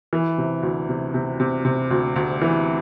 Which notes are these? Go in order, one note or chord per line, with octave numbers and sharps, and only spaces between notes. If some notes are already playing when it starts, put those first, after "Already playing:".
E3
C3
D2
C3
C3
C3
C3
D2
D2
E3